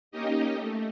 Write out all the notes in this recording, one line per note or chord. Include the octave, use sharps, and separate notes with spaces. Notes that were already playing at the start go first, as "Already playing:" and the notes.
A#3 C#4 D#4 G4 D#5
A3